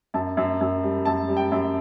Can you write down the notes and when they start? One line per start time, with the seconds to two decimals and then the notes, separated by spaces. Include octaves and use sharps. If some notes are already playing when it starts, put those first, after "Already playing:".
0.14 F#2 A5
0.37 F#2
0.61 F#2
0.83 G3
1.05 F#2 A5
1.28 G3
1.37 G5
1.52 F#2